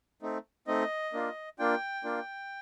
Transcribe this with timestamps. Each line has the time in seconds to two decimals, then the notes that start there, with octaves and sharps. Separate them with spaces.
0.22 A3 C4 D#4
0.67 A3 C4 D#4 D#5
1.13 A#3 D4 F4
1.59 A#3 D4 F4 G5
2.04 A#3 D4 F4